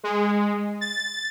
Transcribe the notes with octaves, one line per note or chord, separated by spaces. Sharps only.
G#3
A6